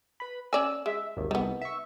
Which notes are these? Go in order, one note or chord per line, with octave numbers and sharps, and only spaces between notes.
B4 B5
C#4 D5 G#5 E6
G#3 E5
G#1 D#2
C2 D#3 B3
E5 C#6